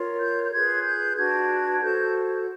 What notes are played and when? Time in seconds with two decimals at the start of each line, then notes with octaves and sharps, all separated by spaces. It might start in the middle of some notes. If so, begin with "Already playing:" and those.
Already playing: F4 A#4 C#5
0.19 G6
0.43 G6
0.52 F4 G#4 B4 G#6
0.84 G6
1.16 D4 F#4 B4 G#6
1.81 F#4 A4 C5 G6